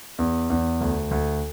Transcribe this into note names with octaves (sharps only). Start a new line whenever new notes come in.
E2
E2
D2
D2